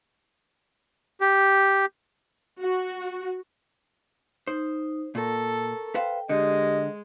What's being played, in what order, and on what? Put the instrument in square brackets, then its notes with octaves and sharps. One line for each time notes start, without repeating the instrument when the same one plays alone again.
[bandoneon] G4
[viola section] F#4
[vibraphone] D#4 [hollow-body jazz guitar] C5
[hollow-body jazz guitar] A#2 [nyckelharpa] A4 [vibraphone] A#4 A#5 C#6
[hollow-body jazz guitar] B4 C5 F5 [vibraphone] G5
[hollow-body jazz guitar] D3 [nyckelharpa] G#3 [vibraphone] G4 [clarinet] D#5